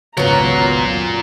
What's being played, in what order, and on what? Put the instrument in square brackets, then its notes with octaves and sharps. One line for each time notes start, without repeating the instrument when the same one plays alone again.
[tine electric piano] G#1 C#2 F#2 [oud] F#3 B3 [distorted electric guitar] F4 A#4 [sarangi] A#5